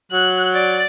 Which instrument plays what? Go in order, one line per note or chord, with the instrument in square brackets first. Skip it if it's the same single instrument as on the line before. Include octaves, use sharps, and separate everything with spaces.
[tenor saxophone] F#3 [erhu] F#6
[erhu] D5